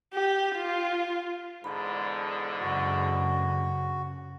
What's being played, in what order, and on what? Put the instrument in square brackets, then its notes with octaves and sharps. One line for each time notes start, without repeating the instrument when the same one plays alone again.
[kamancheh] G4
F4
[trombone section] E2 G#2 D3 [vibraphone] B5
[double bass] F#2 C#3 [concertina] F#4